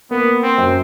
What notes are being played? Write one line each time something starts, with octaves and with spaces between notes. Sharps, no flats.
A#3 B3
C4
F#2